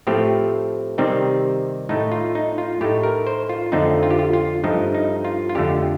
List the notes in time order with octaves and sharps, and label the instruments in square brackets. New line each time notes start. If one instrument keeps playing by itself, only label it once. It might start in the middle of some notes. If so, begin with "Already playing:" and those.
[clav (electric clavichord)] A2 F3 A3 C4 G4
C3 D#3 G3 C4 D#4
A2 A3 D#4
F4
D#4
F4
A2 A3 D#4 G4
A#4
C5
F4
F2 D3 A3 C4 D#4
F4
G4
F4
F4
G2 F3 A3 D#4
D#4
F4
F4
F2 D3 A3 G4